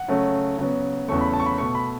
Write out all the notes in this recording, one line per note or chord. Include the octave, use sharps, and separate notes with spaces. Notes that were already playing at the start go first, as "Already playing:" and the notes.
Already playing: F#5
C#3 F#3 A3
C#3 F#3 B3
E2 C#3 F#3 A3 C#6
B5
A5
C#6
B5
B2 A3 C#6
B5